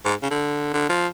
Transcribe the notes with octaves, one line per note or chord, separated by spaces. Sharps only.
G#2
C#3
D3
D3
F3